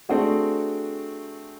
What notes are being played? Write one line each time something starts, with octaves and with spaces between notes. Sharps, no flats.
A3 C4 D4 F#4 G#4